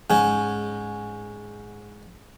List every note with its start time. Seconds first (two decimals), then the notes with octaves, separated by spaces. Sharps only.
0.10 G#2 C#4